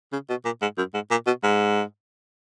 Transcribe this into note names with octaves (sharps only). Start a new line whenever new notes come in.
C#3
B2
A#2
G#2
F#2
G#2
A#2
B2
G#2